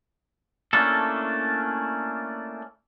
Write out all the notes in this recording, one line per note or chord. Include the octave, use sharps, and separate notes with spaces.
A3 A#3 C#4 D4 E4 A4